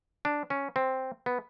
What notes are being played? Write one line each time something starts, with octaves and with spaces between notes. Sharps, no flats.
D4
C#4
C4
B3